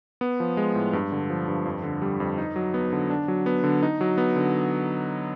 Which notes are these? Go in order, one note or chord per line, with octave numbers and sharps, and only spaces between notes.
B3
F3
G#3
A2
G2
D3
F3
G2
F2
D3
G3
F2
D#4
F#3
B3
D3
D4
F#3
B3
D3
D#4
F#3
B3
D3